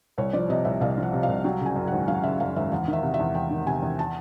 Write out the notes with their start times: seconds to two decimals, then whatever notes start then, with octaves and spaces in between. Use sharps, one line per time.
0.18 C2 C#5
0.33 F3 D5
0.49 C3 D#5
0.65 C2 E5
0.81 C2 F5
0.98 F3
1.03 F#5
1.13 C3
1.23 F5
1.28 C2
1.44 F#3 G5
1.61 C#3 G#5
1.76 F#2
1.88 G#1 F#5
2.08 F#3 F5
2.23 C#3 E5
2.40 F#2 F5
2.56 G#1 E5
2.72 E2 F5
2.88 D#3
2.93 E5
3.03 C3
3.14 E5
3.19 E2
3.35 E2 G5
3.50 D#3
3.66 C3 G#5
3.82 E2
3.99 A5